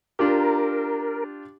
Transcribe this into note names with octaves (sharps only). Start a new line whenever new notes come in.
D4 F4 G4 A#4